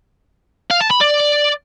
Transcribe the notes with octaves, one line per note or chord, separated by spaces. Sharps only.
F5
A5
B5
D5